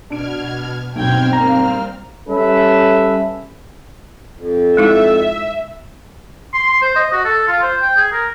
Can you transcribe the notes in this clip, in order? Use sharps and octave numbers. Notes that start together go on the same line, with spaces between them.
B2 D4 F6 G#6 D7
B1 G2 B2 C4 G5 F6 G#6
G3 A#3 A#5
G3 C#4 A4 B4 E5
F2
G#3 D#4 E4 E5
C6
C6
C5
D#5
F#4
A4
F4
C5
G5
G#4
A#4